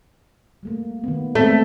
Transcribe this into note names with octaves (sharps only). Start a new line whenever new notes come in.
G3 A3 A#3
D#3 B3
G#3 A3 B3 C4